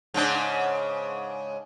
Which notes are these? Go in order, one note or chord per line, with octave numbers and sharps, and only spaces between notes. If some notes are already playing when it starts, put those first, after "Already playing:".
G#2 C#3 D4